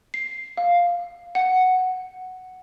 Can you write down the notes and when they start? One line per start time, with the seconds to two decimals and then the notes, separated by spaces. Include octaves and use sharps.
0.14 C7
0.57 F5
1.35 F#5